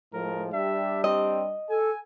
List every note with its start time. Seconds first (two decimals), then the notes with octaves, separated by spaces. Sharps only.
0.13 A2 F3 G#3 A#4
0.53 G3 D4 G4 E5
1.04 C4 D#5
1.70 A4 G#5